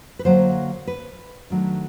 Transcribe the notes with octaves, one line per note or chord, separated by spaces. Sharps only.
B4
D3 F#3 A#3 C5
B4
D#3 F#3 A3 D4